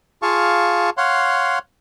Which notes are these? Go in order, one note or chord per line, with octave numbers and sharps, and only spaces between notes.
F4 G#4 F5 A5 C#6
C#5 F5 F#5 C6